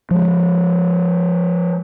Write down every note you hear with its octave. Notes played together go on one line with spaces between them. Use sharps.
F3 G#3